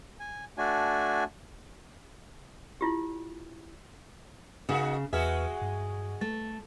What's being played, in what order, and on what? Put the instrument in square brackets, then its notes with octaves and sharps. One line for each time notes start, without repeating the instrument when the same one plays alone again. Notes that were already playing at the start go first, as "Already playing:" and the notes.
[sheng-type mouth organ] G#5
A3 D4 F#4 G#5
[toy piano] E4 F4 G4
[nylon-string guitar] C#3 [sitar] A#3 D#4 F#4
[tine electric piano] E2 B4 F6 [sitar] G#3 F#4 G#4 [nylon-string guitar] E5
[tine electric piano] G2
[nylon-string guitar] A3 [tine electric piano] A6